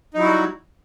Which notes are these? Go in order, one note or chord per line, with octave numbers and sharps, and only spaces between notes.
F#3 G3 D#4 E4 F#4